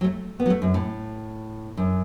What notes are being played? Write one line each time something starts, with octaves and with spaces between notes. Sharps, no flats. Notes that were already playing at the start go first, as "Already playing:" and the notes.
F#3
A3
B3
F#3
A3
F#2
A2
F#2